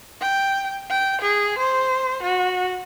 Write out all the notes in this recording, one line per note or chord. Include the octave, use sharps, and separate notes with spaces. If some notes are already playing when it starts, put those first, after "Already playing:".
G5
G5
G#4
C5
F#4